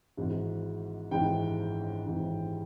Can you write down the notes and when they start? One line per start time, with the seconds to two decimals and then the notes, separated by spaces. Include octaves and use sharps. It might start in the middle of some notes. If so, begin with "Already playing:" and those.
0.17 G#1 G#2 E3
1.11 G#1 G#2 E3 G5
2.06 G#1 G#2 E3